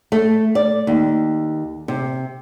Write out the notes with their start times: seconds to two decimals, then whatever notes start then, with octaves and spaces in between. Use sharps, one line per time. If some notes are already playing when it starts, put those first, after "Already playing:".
0.12 A3
0.55 D5
0.87 D#2
1.88 C3